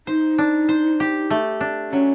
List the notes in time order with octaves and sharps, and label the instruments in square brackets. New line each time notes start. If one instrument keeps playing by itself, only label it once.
[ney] D#4 [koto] C5
[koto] D4
C5
G4
A3
D4
[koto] F#3 [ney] C#4